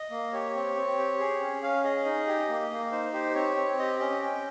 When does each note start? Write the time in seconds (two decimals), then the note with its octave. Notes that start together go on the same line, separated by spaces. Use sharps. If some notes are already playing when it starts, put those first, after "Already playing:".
Already playing: D#5
0.11 A#3
0.33 G4 C#5
0.55 C4
0.76 C4
0.98 G4
1.20 G#4
1.41 C#4
1.62 C#4 F5
1.84 G#4 D#5
2.05 D#4
2.27 G4
2.49 A#3
2.70 A#3
2.92 D#4 C5
3.13 G4 C5
3.35 C4 C#5
3.56 C4
3.79 G4 D#5
4.00 C#4 D#5
4.21 C#4 G5